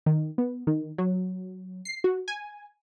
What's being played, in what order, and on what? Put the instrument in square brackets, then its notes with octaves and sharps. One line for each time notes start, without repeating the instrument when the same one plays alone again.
[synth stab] D#3
B3
D#3
F#3
C7
F#4
G#5